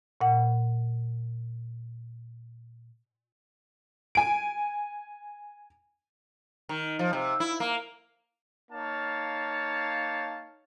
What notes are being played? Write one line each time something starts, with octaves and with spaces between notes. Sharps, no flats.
A#2 F#5
G#5 D7
D#3
F3
C3
E4
A#3
A#3 D#4 C#5 F5 A5